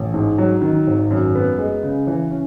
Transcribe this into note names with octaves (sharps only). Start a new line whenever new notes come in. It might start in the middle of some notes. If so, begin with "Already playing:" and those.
Already playing: A1
G#2
F#3
D#3
G#1
F#2
B3
G#3
C#3
E3
C#4